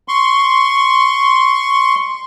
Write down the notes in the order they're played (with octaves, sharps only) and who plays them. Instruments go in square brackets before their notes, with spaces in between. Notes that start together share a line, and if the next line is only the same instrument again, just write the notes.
[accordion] C6 C#6